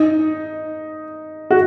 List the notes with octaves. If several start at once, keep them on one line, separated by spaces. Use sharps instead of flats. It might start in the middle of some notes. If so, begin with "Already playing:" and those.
Already playing: D#4
F#4